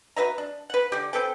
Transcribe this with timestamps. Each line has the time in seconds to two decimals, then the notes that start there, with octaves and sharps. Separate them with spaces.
0.16 F#4 B4 E5 A#5
0.38 D4
0.70 B4 F#5
0.92 D3 G4
1.13 C4 A4 B4 G5